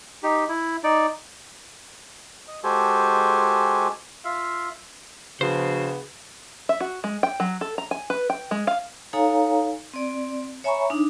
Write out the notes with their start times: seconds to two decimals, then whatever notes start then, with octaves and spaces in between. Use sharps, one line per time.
0.23 D#4 G4
0.49 E4
0.84 D#4 D5
2.48 D#5
2.63 G#3 F#4 G4 A4 C5 G#5
4.25 F4 E5 F5
5.41 C#3 F3 B3 D4 F#4 C5
6.69 E5
6.80 F#4
7.04 G#3
7.23 G5
7.40 F#3
7.61 A4
7.78 A#5
7.91 G#5
8.10 B4
8.30 G5
8.51 G#3
8.67 F5
9.13 D#4 A4 C#5 F5 G#5 A#5
9.94 C4 D5
10.64 C#5 E5 G#5 A#5 B5 C#6
10.90 D4 D#4